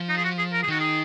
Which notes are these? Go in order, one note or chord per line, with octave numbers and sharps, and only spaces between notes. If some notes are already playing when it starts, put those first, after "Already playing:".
Already playing: F3
D#4
G#4
F#4
G#4
A#4
G#4
D#3 F#4
G#4